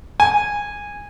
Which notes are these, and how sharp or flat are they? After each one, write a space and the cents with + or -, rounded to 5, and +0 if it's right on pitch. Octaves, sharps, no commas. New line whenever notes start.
G#5 -15